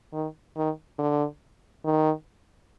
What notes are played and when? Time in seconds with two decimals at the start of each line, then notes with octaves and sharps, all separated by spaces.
0.13 D#3
0.57 D#3
0.98 D3
1.85 D#3